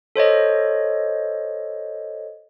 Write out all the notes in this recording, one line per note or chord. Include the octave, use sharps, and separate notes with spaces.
A4 C5 C#5 D#5